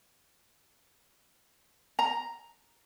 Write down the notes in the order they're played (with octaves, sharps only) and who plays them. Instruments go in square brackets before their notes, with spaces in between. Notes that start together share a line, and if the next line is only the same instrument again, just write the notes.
[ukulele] A#5